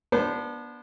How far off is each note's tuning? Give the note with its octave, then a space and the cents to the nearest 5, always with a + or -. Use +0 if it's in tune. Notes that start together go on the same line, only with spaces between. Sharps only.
B3 -35 D4 +0 C5 -35